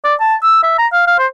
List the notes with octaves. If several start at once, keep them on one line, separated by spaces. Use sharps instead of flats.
D5
A5
E6
E5
A#5
F5
F5
C5